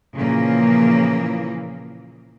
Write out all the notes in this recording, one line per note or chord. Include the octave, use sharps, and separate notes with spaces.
A#2 C#3 E3 F3 A#3